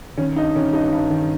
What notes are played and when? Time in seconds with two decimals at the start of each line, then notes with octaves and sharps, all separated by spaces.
0.17 D#3 C#4
0.36 G2 D#4
0.55 D#3 C#4
0.73 G2 D#4
0.92 G2
1.10 D#3